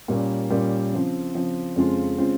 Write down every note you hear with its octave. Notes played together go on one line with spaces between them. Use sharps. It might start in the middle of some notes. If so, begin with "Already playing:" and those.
A#2 G3 A#3 C#4
A#2 G3 A#3 C#4
C#3 F3 C4
C#3 F3 C4
F2 C#3 G#3 C4 F4
C#3 G#3 C4 F4